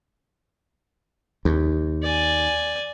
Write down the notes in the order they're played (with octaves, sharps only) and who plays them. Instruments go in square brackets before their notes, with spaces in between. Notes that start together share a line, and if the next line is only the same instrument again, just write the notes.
[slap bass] D#2
[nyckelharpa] D5 G#5